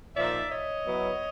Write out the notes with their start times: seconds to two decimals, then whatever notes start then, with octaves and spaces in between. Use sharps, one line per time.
0.15 A#2 F3 A#3 D#4 D5 E5
0.50 C#5 D#5
0.85 F#3 B3 E4